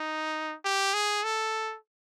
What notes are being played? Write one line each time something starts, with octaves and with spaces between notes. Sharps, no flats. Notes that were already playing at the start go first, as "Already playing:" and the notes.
Already playing: D#4
G4
G#4
A4